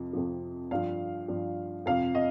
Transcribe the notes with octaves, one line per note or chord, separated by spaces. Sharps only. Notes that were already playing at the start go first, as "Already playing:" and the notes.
Already playing: F2 C3 F3
F2 C3 F3
G2 F3 F5
G2 F3
F2 C3 F3 F5
D#5